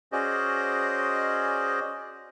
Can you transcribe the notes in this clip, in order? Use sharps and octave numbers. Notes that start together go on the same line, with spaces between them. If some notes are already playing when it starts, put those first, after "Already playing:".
C#4 F#4 G#4 C5 D5 D#5